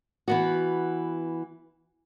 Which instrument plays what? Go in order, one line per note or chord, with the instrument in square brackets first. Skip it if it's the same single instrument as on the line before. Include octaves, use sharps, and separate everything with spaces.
[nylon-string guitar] E3 B3 F#4